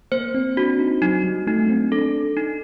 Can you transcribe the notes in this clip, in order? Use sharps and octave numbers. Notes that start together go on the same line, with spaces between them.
A#3 C5
C4
D4 F#4
D#4
F#3 D#4
G3
A3 D#4
C4
D4 A4
D#4